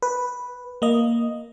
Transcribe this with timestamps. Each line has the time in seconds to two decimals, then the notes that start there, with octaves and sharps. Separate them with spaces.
0.02 B4
0.82 A#3 D#5